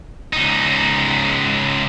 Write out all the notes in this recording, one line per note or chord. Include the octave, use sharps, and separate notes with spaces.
C#2 D#4